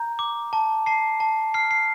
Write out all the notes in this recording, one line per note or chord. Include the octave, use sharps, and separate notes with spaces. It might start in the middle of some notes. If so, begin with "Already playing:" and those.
Already playing: A#5 G6
D6
A5
A5 C7
A5
F6 C7
C7